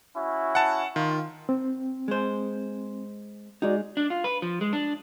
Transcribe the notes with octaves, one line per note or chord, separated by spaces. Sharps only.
C#4 E4 F#4
F#5 A5
D#3 F4
C4
G#3 C5
G#3 D#4 F#4 D5
D4
F4
B4
F3
G#3
D4